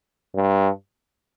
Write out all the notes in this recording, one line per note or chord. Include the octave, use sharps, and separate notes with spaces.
G2